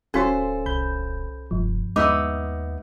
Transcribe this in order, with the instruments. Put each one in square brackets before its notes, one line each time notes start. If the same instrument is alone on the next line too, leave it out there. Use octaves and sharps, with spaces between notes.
[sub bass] D1 [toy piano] C#4 F#4 [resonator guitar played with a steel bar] A4 C5 [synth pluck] C#5 F5 G#5
[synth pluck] C2 B5 G6
[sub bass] F1 [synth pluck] G2 F3
[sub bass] D#2 [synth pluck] G#3 D#5 E5 [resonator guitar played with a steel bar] B3 D#4 [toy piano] D6 E6